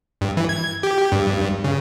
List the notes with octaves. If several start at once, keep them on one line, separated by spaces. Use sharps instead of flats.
G2
E3
G#6
G4
G2
C#3